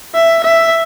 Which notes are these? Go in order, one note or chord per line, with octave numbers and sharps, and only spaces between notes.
E5
E5